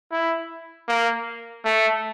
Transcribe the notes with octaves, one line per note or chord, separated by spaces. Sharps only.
E4
A#3
A3